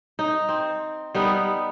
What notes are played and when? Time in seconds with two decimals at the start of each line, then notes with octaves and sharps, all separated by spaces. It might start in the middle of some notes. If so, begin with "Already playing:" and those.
0.19 D#4
0.49 C4
1.15 G3 B3 D#4